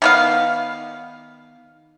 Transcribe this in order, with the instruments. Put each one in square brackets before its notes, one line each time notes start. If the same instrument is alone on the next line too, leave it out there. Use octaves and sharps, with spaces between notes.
[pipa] D#3 B3 F5